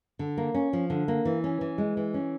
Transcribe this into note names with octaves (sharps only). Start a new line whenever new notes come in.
D3
A#3
C#4
F3
D3
A#3
E3
C#4
E3
G#3
E3
C#4